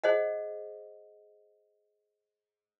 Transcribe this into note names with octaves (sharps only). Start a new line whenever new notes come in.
G#4 C5 D#5 F#5